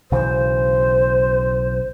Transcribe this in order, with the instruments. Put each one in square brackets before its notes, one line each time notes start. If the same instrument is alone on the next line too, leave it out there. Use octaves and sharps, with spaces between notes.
[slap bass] B1 C#3 E3 [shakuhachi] C5